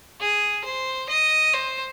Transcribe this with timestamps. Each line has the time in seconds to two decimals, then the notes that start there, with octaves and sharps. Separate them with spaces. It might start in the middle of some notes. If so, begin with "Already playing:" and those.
0.20 G#4
0.65 C5
1.10 D#5
1.53 C5